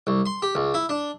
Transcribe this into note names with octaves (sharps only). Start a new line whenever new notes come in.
C2
C6
G4
C#2
E4
D4